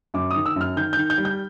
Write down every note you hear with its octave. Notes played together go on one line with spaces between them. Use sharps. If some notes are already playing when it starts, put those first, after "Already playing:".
F#2 D6
D#6
D#3
E6
F#2 F6
D#3 G6
G6
D#3
G6
G3
G6